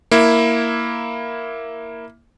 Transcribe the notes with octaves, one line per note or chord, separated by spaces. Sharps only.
A#3 E4